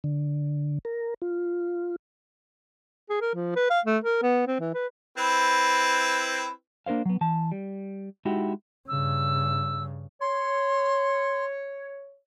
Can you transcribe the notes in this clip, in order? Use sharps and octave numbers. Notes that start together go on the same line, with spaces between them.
D3
A#4
F4
G#4
A#4
F3
B4
F5
A3
A#4
B3
C4
E3
B4
C4 E4 B4
A#3 D4 A#4 C5 F5
F#3 B3
E3 A5
G3
G#3 D#4 E4 F#4 G4
G2 C#3 E6
C#5 C6